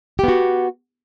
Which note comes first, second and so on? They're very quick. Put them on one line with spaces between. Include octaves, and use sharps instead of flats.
G4 B3 F#4